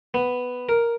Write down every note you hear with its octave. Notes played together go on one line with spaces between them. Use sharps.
B3
A#4